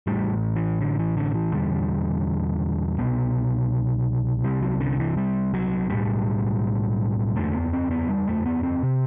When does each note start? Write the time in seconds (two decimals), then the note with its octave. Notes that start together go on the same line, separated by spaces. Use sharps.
0.07 A1 A2 G3
0.56 E3
0.81 D3
0.99 E3
1.17 D3
1.34 E3
1.53 E1 E2 D3 G3
2.99 C2 B2 B3
4.44 C2 C3 G3
4.62 F#3
4.80 D3
4.99 E3
5.17 G3
5.54 F#3
5.90 B1 A2 G3
7.36 F#1 E2 D3 A3
7.54 B3
7.73 C4
7.91 B3
8.09 G3
8.27 A3
8.46 B3
8.63 C4
8.83 C3